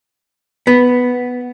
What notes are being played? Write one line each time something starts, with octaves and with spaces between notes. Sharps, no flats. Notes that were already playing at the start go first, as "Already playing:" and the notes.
B3